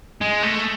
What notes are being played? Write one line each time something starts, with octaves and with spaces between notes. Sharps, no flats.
G#3
A3